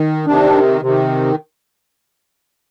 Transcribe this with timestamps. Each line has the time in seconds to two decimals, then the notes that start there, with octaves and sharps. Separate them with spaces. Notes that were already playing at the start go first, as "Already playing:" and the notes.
Already playing: D#3
0.27 C3 D#3 D4
0.81 C3 D#3